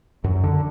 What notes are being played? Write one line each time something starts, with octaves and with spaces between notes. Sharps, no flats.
F#2
D3